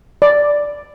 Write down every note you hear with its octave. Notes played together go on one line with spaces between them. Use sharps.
D5